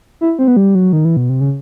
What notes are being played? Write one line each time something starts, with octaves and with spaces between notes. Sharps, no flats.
E4
C4
B3
G3
F#3
D#3
E3
B2
C3
C#3